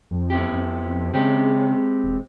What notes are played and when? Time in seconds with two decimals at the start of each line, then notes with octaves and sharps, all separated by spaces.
0.11 F2
0.30 B3 E4 G4
0.52 F2
1.14 C#3 G#3 C4 G4
2.04 E1